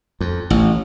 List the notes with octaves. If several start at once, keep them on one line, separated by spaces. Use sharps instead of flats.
F2
A1